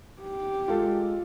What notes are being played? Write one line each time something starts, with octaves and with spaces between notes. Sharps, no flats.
G4
G#3 F4 A4